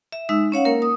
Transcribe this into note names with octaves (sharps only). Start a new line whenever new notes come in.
E5
G#3 D#4 E5 E6
C#4 C#5 F5 F#5
A#3 A#4
D#6